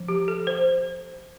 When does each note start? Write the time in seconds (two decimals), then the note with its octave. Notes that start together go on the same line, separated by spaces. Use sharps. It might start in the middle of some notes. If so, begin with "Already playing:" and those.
Already playing: F3
0.08 G4
0.28 A4
0.47 C5